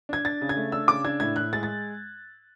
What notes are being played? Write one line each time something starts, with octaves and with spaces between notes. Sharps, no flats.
D4 G#6
D4 A6
C#3
G#6
A3
D4 E6
C#3 D6
D4 G#6
A2 G#6
A2 F#6
G#3 A6
A6